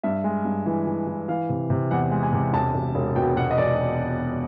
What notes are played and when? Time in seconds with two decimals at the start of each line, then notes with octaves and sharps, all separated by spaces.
0.03 G2 E5
0.24 G#3
0.45 G2
0.66 E3
0.87 E3
1.07 E3
1.28 E3 F5
1.49 C3
1.70 C3
1.91 E2 F#5
2.11 G#3
2.23 G#5
2.33 C3
2.53 E1 A5
2.75 E1
2.95 E1
3.16 B2 G5
3.36 B2 F#5
3.51 D#5
3.58 E1 D5